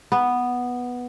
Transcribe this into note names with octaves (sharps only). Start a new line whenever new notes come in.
B3